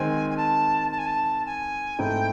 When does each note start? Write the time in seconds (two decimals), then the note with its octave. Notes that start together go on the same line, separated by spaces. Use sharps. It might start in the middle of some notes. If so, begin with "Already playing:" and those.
Already playing: D#3 G#3 C4 G#5
0.30 G#5
0.37 A5
0.91 A5
0.98 G#5
1.06 A5
1.45 G#5
1.99 G#2 E3 A3 C4 E4 G5